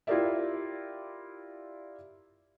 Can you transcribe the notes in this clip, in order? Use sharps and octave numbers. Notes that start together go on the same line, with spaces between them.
E4 F4 G4 A#4 D5 E5